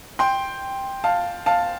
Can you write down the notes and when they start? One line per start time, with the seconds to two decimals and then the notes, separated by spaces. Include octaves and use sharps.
0.19 G5 C6
1.04 F5 A5
1.46 F5 A5